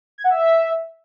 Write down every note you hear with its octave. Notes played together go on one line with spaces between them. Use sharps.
G#6
F#5
E5